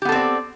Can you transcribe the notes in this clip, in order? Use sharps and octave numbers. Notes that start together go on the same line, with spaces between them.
B3 C4 G4 A4 D5